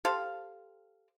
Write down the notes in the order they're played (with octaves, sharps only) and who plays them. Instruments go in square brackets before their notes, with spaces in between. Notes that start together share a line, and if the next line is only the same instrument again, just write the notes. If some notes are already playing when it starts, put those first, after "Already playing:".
[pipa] G4 A4 C5 F5